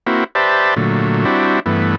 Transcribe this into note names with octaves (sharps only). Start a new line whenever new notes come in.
A#3 C4 E4 F#4
G4 B4 C5 D5 E5 A5
A#2 D3 F#3 A3
G3 C4 D4 E4 F#4
G2 E3 A3 B3